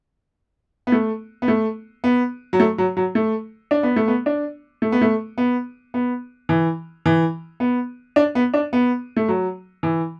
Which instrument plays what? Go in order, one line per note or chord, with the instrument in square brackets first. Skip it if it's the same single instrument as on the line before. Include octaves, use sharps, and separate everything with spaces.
[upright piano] B3
A3
B3
A3
B3
F#3
A3
F#3
F#3
A3
D4
B3
A3
B3
D4
A3
B3
A3
B3
B3
E3
E3
B3
D4
B3
D4
B3
A3
F#3
E3